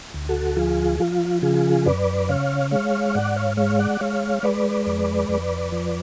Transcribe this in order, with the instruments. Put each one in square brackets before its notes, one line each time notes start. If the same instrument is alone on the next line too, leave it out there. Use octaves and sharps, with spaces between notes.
[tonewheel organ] D2
F#4 A4
F3 F4 G#4
F3 F4
C#3 F4 G#4
F#2 B4 D5
C#3 C#5 F5
G#3 C#5 F5
G#2 D5 F#5
C#5 F5
G#3 C#5 F5
D5 F#5
G#3 C#5 F5
G#3 B4 D5
F2
F2
F3